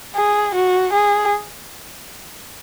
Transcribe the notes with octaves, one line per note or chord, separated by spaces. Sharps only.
G#4
F#4
G#4